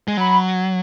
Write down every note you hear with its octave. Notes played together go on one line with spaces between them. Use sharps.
G#3
F#3 B5